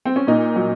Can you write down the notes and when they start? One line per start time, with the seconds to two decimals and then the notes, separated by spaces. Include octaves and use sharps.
0.05 C4
0.16 C#4
0.27 A#2 D#4
0.56 F#3